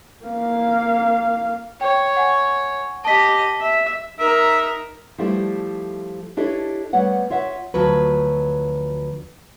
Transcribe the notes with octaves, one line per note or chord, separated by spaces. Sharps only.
A#3 F5
C#5 G5
F#5 G#5
G4 D#5 A5 B6
E5
D#4 A#4 E5
F3 G3 A3 E4 G4
D4 E4 G4 A4 C#5 D#5
G3 A3 B3 C#5 F#5
F4 C#5 E5 F#5
D2 F3 F#3 B4